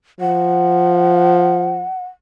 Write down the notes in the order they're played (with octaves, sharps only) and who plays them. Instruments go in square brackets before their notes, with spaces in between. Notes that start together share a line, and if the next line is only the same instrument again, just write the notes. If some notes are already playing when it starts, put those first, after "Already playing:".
[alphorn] F3 [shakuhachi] F#5